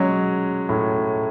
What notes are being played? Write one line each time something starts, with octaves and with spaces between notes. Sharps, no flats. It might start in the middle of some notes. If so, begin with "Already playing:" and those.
Already playing: F#3 G#3 C#4
A2